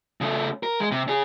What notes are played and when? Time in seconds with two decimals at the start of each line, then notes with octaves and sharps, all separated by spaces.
0.21 C#3 A3
0.63 A#4
0.80 G#3
0.92 C3
1.08 C#4 G#4